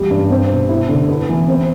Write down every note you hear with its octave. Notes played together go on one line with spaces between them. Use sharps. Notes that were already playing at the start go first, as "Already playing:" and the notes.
Already playing: E2 G3
G2
C4
B2
E4
D3
B3
E3
C4